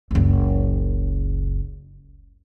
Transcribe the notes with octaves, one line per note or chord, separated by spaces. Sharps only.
F#1 C#2